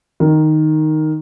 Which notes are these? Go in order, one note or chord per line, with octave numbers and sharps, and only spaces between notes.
D#3